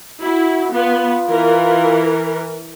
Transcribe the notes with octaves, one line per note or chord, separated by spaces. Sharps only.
E4 F#4
B3 F4
E3 A#4